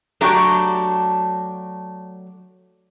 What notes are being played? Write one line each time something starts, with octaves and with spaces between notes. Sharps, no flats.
F#3 A3 D4 F#4 G4